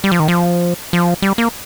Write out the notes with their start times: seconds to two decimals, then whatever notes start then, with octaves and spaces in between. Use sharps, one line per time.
0.04 G3
0.12 F3
0.20 D#3
0.28 F3
0.93 F3
1.22 G3
1.38 A#3